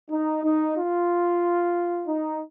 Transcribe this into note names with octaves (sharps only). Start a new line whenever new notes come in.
D#4
D#4
F4
D#4